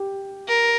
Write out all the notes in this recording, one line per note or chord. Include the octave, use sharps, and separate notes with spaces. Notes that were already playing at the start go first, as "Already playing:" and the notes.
Already playing: G4
A#4